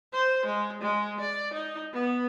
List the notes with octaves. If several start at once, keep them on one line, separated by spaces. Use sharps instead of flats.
C5
G#3
G#3
D5
D#4
B3